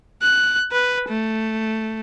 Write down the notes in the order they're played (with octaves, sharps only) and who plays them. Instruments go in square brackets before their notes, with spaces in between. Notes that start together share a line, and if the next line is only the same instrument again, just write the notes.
[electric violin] F#6
B4
A3